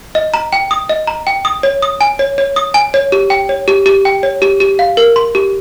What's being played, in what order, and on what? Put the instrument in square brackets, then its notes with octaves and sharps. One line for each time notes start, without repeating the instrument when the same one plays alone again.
[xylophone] D#5
A#5
G5
D#6
D#5
A#5
G5
D#6
C#5
D#6
G#5
C#5
C#5
D#6
G#5
C#5
G4
G5
C#5
G4
G4
G5
C#5
G4
G4
F5
A#4
C6
G4